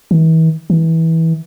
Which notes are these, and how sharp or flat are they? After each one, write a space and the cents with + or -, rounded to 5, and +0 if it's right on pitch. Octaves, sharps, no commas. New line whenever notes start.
E3 -40
E3 -20